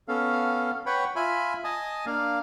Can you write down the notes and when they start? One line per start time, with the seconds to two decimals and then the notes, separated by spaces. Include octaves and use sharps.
0.08 B3 C#4 A4 F5
0.86 B4 C#5 F#5 G5 B5
1.16 F4 E5 G#5 B5
1.64 D#5 G#5 A5 D#6
2.06 A#3 D4 F5